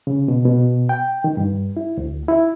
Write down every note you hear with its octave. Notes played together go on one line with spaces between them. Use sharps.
C#3
B2
B2
G5
D#3
G2
E4
D2
E4